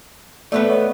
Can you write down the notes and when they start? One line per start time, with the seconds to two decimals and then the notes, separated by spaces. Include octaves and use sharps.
0.52 A3 B3 B4 D5 E5
0.70 C#5 D#5